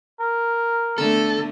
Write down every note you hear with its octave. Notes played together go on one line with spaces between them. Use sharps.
A#4
D3 A3 B3 A4